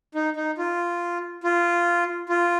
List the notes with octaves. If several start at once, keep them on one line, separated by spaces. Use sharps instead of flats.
D#4
D#4
F4
F4
F4